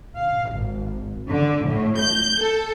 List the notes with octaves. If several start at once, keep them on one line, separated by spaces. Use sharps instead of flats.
F5
G#1
D3
A2
G6
A4